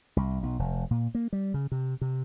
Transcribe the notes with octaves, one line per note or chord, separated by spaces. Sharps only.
C2
B1
F1
A#2
A#3
G3
C#3
C3
C3